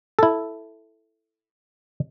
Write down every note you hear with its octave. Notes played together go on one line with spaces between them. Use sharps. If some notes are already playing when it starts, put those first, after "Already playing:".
E4 A4